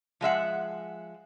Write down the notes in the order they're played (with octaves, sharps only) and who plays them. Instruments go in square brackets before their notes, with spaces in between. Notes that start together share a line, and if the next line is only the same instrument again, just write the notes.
[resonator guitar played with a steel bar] F3 G#3 E5 F#5